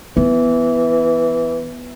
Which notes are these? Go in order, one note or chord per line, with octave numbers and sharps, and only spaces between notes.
E3 B3